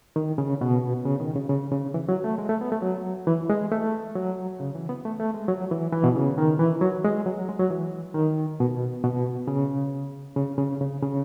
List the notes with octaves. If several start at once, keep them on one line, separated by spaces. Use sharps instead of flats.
D#3
C#3
B2
C#3
D#3
C#3
C#3
C#3
E3
F#3
A3
G#3
A3
B3
A3
F#3
E3
G#3
A3
F#3
C#3
E3
B3
A3
A3
G#3
F#3
E3
E3
B2
C#3
D#3
E3
F#3
G#3
F#3
G#3
F#3
E3
D#3
B2
B2
C#3
C#3
C#3
C#3
C#3